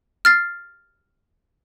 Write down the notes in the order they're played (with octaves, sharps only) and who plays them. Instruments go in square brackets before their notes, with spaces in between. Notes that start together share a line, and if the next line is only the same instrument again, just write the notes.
[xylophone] F6 A6 C7